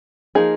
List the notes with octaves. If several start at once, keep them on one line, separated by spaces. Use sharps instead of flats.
F3 A#3 D#4 G#4